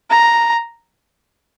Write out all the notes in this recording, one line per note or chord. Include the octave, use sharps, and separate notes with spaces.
A#5